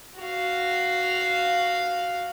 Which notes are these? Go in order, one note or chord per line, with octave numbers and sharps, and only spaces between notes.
F#4 F5